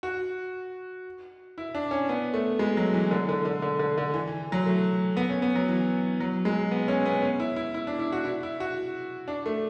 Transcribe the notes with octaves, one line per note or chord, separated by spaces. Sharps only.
F#4
E4
D4
C#4
B3
A3
G#3
F#3
E3
D3
D3
D3
D3
D3
D3
E3
E3
F#3
A3
B3
C#4
B3
F#3
E3
F#3
G#3
B3
C#4
B3
C#4
E4
E4
E4
D4
E4
F#4
E4
E4
F#4
D4
A3